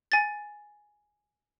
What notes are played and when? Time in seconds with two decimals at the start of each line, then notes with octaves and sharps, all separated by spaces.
0.12 G#5 A6